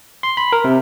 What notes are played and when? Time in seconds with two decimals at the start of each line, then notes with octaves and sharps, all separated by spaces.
0.23 C6
0.37 B5
0.53 A#4
0.64 C3